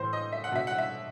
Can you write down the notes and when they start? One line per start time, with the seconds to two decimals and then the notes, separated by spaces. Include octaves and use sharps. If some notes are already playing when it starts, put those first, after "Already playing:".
Already playing: A2 E3 C5
0.13 D#5
0.32 E5
0.44 F#5
0.52 B2 E5
0.67 F#5
0.78 E5